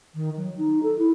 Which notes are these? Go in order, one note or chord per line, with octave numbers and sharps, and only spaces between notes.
D#3
F#3
D#4
A4
E4